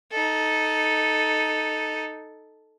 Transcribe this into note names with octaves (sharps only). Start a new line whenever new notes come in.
D#4 A4